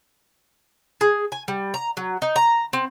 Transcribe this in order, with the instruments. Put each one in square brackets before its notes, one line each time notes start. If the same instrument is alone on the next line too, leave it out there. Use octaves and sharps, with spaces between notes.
[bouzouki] G#4
G#5
G3
A#5
F#3
D#4
A#5
C4